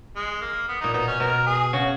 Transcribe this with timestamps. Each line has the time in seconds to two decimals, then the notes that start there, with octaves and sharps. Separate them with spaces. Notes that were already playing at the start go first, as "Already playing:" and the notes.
0.16 G#3
0.41 A#3
0.68 B3
0.81 A#2 D#4
0.94 B2 D#4
1.07 C#4
1.20 B2 A#4
1.46 G#4
1.73 C#3 F#4